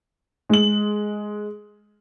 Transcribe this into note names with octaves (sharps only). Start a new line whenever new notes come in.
G#3 F#7